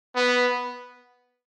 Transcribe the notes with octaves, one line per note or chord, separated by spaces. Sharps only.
B3